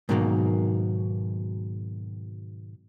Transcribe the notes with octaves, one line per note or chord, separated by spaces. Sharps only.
G#2 B2 D#3 F#3 G3 A#3